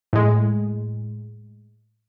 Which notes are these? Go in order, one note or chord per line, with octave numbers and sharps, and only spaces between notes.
A2 G#3